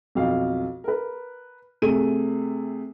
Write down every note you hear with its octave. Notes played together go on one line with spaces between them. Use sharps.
B1 F2 F5
A#4 B4
C3 A3 G#4 D#7